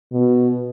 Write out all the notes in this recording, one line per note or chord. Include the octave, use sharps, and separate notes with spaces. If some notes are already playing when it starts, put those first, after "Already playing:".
B2